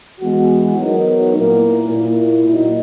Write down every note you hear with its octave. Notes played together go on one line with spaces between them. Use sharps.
E3 G#3 B3 F#4
F#3 B3 D#4 A#4
A#2 A#3 E4 A#4
A#2 A#3 E4
A#2 F#3 A#3 D#4 F#4